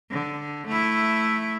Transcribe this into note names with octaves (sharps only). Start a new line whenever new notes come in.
D3
A3 E4